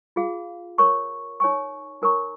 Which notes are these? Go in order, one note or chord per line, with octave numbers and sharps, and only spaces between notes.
F4 G#4 F5
A#4 C#5 A#5 C#6
D#4 C#5 G#5 C#6
D#4 A#4 C#5 A#5 C#6